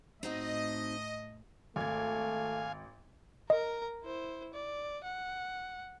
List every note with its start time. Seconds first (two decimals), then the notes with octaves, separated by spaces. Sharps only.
0.23 A2 C4 D#4 F#4 D#5
1.76 G#1 A3 F5 G#5 G#6
3.50 A#4 D#5 A#5
4.04 E4 C5
4.54 D5
5.04 F#5